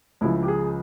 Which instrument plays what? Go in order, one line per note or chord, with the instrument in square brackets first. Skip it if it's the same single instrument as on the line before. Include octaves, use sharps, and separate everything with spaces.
[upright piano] C#2 C#3 F3 E4
G4
G#4